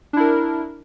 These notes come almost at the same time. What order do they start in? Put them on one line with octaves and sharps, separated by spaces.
D4 E4 A#4